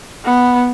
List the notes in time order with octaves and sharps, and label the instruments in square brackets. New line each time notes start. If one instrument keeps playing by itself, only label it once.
[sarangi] B3